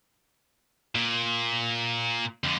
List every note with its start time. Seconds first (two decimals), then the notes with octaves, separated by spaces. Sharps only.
0.95 A#2
2.44 F2 D3